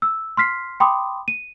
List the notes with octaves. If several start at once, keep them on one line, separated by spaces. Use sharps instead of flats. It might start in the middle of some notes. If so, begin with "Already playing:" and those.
E6
C6 F6 B6 C7
G5 B5 C6 D6 D#6
D#7